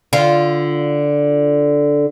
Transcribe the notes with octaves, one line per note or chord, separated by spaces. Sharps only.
D3 F4